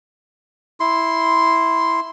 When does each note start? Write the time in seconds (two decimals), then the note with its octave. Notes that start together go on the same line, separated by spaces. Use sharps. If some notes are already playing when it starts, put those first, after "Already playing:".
0.80 E4 C6